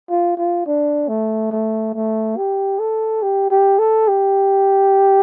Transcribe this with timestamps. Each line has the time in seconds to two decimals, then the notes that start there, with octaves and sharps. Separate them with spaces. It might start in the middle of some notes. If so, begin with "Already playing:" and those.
0.10 F4
0.37 F4
0.67 D4
1.08 A3
1.52 A3
1.94 A3
2.37 G4
2.79 A4
3.22 G4
3.51 G4
3.79 A4
4.08 G4